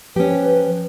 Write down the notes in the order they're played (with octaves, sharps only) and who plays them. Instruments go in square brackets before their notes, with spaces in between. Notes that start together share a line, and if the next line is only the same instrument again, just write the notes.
[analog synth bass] F3 [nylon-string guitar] C#4 G4 [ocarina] B4